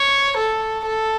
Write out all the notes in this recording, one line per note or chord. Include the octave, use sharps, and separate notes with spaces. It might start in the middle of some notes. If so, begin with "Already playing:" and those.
Already playing: C#5
A4
A4